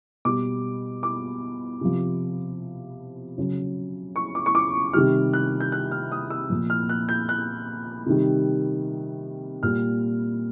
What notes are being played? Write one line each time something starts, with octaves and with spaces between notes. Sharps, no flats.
B2 G3 D6
D6
C3 F3
C#3 F#3
C#6
D6
C#6
D6
C3 D#3 G3 F6
F#6
G6
F#6
F6
D#6
E6
A#2 F3
F6
F#6
G6
F#6
C3 D#3 G3
A#2 G3 F6